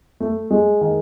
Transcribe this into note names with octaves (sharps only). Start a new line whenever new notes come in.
A3
G#3
D#3